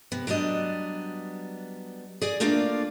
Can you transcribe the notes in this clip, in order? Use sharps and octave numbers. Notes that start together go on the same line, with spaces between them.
C3 B3
F#3 G3 B3 D4 D#5
G#4 D5 D#5
A3 A#3 D4 F4 D5 F5